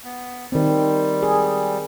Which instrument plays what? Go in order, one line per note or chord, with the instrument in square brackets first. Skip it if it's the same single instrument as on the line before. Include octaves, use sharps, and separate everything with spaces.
[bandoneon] B3
[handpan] D#3 C4 [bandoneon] G3
[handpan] G#4